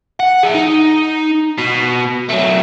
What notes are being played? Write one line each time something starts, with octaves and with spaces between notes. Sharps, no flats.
F#5
G#4 E5
D#4
B2
F#3 A3